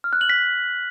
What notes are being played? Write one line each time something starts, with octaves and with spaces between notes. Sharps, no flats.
F6
F#6
F#7
B6